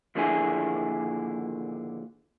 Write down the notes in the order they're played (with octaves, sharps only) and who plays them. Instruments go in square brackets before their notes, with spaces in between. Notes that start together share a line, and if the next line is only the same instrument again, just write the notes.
[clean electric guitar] D#2 A#2 D3 F3 E4 G#4